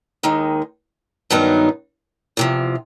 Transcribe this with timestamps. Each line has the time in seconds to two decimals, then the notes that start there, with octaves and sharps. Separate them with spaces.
0.23 D#2 D#3 G#3
1.30 G2 D#3 F#3 B3 D#4
2.37 E2 C3 F3